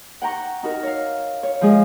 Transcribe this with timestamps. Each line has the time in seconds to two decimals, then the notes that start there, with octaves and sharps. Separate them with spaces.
0.22 F#5 G5 A#5 C#6
0.63 D#4 F#4 A#4
0.83 C#5 F5
1.43 C#5
1.61 F3 G#3 G#4